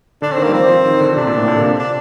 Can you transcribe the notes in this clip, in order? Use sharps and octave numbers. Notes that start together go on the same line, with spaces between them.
D3 D4
C4
D#3 A#3
G3
F3 C4
F3
D#3
D3
C3 D4
A#2
A2
A#2
D3
C3
D4